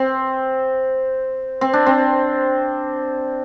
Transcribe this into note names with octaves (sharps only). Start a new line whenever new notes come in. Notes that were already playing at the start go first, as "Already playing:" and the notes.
Already playing: C4
C4
D4
C4